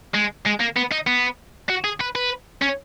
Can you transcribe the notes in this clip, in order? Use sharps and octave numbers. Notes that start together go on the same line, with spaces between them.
G#3
G#3
A#3
B3
D#4
B3
F#4
G#4
B4
B4
C#4